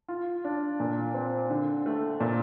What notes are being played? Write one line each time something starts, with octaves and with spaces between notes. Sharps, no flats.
F4
D4
A#2
C4
D3
A3
A#2